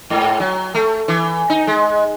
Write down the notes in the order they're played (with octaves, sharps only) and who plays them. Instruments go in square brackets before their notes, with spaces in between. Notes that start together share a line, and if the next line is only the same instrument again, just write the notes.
[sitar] G#2
F#3
A3
E3
D#4
G#3